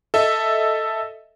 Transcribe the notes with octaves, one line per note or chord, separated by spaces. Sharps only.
A4 D#5 E5